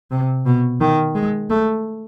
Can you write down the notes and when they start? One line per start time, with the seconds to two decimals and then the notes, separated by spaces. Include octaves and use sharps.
0.11 C3
0.46 B2
0.81 D#3
1.15 G#3
1.50 A3